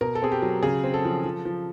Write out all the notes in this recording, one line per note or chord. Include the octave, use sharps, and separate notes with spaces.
B2 A#4
A4
C4 G#4
G4
F#3
C#3 G#4
C4
A4
F3
F3
F3